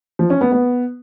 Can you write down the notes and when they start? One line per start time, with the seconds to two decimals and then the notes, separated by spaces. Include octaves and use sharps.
0.19 F3
0.30 C#4
0.41 B3
0.52 B3